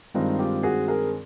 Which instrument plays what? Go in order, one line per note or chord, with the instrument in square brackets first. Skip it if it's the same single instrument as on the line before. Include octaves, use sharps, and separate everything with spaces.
[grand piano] G2 D#3 G#3 C4 D#4 F4
F4 G4
F#4 G#4
G#4 A#4